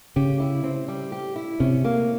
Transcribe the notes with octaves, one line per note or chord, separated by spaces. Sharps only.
C#3 G4
E4
C4
G3
G4
E4
C3 C#4
A#3